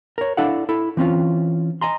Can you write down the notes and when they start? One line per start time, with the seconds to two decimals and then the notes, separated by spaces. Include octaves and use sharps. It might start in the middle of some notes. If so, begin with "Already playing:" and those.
0.18 A#4 C#5
0.37 D4 E4 A4 D5 F5 F#5
0.69 E4 A4
0.97 E3 C4 C#4 F4
1.81 D#5 G#5 A#5 C6